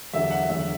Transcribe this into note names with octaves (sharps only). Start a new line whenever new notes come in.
E2 D3 F#3 E5
F#5
E2 D3 F#3 E5